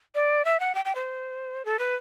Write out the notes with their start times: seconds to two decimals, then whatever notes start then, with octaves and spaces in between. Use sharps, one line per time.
0.15 D5
0.45 E5
0.60 F#5
0.75 G5
0.85 G5
0.95 C5
1.65 A4
1.79 B4